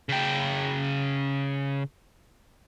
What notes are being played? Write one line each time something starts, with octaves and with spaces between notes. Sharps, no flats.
C#3 G5